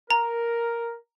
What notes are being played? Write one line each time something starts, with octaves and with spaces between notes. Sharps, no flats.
A#4 A#5